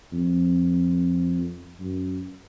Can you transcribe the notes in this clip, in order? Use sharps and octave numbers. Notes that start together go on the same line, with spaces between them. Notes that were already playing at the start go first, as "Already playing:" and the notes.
F2
F#2